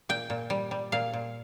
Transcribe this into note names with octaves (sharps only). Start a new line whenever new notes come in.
A#2 G5
A#2
G3
G3
A#2 F5
A#2